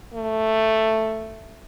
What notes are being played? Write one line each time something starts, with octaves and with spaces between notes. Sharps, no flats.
A3